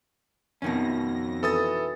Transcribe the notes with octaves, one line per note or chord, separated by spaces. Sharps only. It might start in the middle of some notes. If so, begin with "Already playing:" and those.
F2 B2 D#3 C#4 A#6
E3 A4 D#6 A6